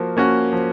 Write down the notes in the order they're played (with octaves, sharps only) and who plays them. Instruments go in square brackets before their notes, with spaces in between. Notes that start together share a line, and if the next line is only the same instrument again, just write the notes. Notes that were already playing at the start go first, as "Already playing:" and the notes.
Already playing: [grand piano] F3 A#3 F#4
A#3 C#4 F#4
F3